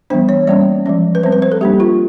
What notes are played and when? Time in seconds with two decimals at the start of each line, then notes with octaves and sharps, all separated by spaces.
0.10 E3 G3 B3 D4 C5
0.29 C#5
0.47 G3 A#3 C#4 D5
0.86 F3 G#3 C#4
1.15 B4
1.23 G3 C4 C5
1.32 B4
1.42 C5
1.52 A4
1.61 G3 A#3 D4 G4
1.80 F4